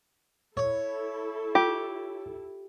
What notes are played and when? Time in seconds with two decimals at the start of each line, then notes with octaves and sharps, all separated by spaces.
0.57 E4 A4 C#5
1.55 F4 G4